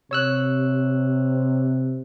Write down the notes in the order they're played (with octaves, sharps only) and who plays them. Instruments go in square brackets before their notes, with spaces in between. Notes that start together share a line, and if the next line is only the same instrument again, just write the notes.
[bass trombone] C3 [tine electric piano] C#5 E6 F#6